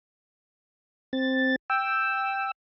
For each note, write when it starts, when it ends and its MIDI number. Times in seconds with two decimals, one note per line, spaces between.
1.13 1.56 60
1.13 1.56 93
1.70 2.51 79
1.70 2.51 88